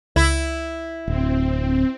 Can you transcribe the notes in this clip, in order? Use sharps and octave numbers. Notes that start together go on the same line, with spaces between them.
C#2 E4
D1 C4